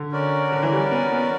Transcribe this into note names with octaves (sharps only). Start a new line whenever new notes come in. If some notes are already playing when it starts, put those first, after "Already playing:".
Already playing: D3
C#4 F#4 A#4 D5
D3
E3
G3
B3
B3